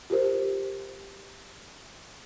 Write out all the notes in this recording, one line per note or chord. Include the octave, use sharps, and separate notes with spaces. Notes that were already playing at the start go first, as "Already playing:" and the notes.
F4 G4 A#4 C5